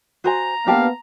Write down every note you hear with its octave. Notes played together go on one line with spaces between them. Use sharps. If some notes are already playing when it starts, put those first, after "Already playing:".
F#4 C5 G#5 A#5
A#3 B3 D4 G4 F5 A5